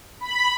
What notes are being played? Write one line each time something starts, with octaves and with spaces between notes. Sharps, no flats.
B5